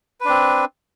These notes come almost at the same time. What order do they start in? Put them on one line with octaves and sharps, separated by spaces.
B4 D4 C4